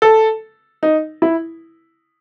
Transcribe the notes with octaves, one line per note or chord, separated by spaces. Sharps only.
A4
D#4
E4